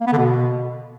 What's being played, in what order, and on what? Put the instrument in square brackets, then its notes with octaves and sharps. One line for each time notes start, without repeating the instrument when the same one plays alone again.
[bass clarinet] A#3
B3
D3
B2